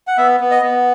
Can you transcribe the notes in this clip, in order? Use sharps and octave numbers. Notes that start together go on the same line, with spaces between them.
F#5
B3 E5
B3
D#5
B3